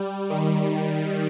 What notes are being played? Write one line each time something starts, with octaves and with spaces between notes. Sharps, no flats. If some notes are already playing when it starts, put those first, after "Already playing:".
Already playing: G3
D#3